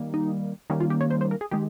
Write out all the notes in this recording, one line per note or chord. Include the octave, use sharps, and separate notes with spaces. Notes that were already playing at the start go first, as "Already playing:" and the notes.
Already playing: D#3 G3 A#3
D#4
D#3 G3 A#3 C#4 D#4
F4
G4
C#5
C5
C5
A#4
G#4
D#3 G#3 G4